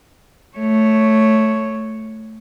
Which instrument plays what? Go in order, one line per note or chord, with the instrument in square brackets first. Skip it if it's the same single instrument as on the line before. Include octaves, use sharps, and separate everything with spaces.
[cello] A3 C#5